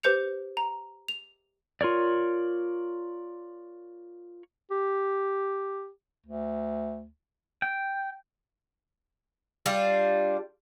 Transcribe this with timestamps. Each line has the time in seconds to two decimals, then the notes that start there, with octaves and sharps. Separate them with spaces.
0.03 G4 B4 C5 G6 C#7 F7
0.57 A#5
1.08 F7
1.81 F4 A#4 C#5 D5
4.71 G4
6.26 D2
7.62 G5
9.66 G3 D4 F4